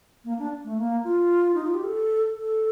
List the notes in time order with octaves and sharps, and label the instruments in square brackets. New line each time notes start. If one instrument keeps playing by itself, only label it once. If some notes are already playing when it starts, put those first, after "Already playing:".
[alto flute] A#3
D4
A3
A#3
F4
D#4
F4
G4
A4
A4